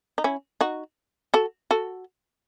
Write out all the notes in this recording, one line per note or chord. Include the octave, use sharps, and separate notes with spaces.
D#4
C#4 E4
D#4 F#4
F#4 A4
F#4 A4